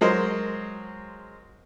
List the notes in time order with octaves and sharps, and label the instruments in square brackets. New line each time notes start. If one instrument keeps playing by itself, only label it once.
[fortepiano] F#3 G#3 A#4 C5 D#5